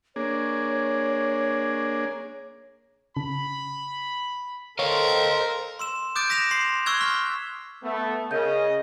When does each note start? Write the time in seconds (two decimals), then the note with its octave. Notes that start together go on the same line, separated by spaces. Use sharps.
0.16 A#3 D4 G#4 C#5
3.17 C#3 B5
4.79 A4 A#4 C5 C#5 D#5 F5
5.79 C6 E6 E7
6.15 D6 D#6 F#6 G6 A6 D7
6.30 D#6 A#6 B6 E7 F7
6.51 C6 C7
6.86 C6 C#6 E6 F#6 G#6
7.01 F6 B6 G7
7.83 A3 B3
8.31 C#3 G#4 A#4 D#5 G6